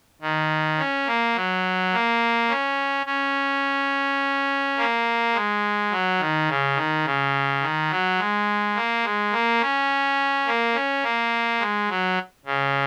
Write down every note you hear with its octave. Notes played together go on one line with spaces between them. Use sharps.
D#3
C#4
A#3
F#3
A#3
C#4
C#4
A#3
G#3
F#3
D#3
C#3
D#3
C#3
D#3
F#3
G#3
A#3
G#3
A#3
C#4
A#3
C#4
A#3
G#3
F#3
C#3